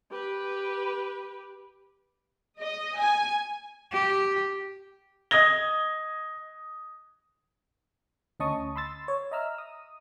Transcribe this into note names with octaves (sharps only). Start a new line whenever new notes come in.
G4 B4
D#5
G#5
G4
D#5 D#6 G#6 A#6 G7
D2 C#4 D#5 A5 C#6 D#6
B5 C6 E6 A6
C#5
D#5 E5 A#5 E6 F6
D#6